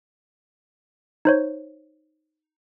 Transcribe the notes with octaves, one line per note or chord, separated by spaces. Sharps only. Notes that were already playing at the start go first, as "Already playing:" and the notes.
D#4 C5 C#5